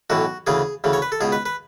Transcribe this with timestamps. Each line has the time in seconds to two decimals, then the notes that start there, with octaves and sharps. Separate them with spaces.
0.10 B1 A2 E3 F#4
0.47 D2 C#3 E3 G#4
0.84 D2 C#3 E3
0.93 C#5
1.02 B4
1.12 A4
1.21 C#2 B2 G#4
1.32 B4
1.46 B4